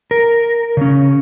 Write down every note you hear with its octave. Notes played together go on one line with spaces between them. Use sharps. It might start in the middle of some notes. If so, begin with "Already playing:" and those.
A#4
C#3 C#4